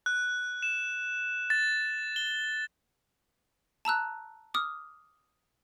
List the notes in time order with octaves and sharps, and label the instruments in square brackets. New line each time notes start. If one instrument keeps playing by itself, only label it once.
[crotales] F#6
E7
A6
G7
[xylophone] A5 A#5 E6 F#6
D6 D#6 F6